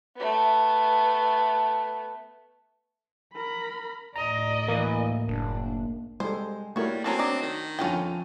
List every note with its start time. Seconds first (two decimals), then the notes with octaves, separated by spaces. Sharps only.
0.16 A3 B3
3.34 A#4 B5
4.16 D2 A2 D5 D#5 A#5
4.68 E3 A#3
5.29 F#1 D4
6.20 G3 G#3 A4 C5
6.76 G3 A3 A#3 E4 F#4 A#4 C#5
7.04 F#3 C4 C#4 A4
7.19 F#3 D4 D5 D#5
7.43 D#3
7.79 F2 D3 C#4 F4 G5